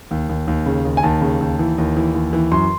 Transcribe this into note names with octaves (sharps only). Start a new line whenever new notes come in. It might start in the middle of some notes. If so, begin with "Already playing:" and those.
D#2
D#2
D#2
C#3
D#2
G#5
D#2 A5
C#3
D#2
E3
D#2
E3
D#2
E3
F#2 C6